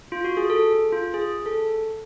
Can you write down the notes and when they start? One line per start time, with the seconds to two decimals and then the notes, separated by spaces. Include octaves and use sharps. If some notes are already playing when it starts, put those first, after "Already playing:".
0.12 F4
0.24 F#4
0.37 G#4
0.50 A4
0.92 F4
1.14 G#4
1.46 A4